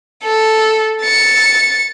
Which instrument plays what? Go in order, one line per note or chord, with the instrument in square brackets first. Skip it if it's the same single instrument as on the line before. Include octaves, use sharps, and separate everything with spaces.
[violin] A4
A6 C#7